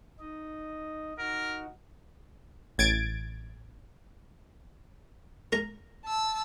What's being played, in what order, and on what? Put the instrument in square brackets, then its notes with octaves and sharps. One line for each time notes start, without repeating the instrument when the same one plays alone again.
[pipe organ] D#4 D#5
[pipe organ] D#4 F#4 [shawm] A#4
[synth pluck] A1 G#6 A6 D7
[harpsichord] A#4 A#5
[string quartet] A5 E6